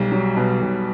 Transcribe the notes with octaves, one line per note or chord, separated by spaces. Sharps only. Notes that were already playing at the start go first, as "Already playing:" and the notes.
Already playing: B1 G3
F#3
B2
B1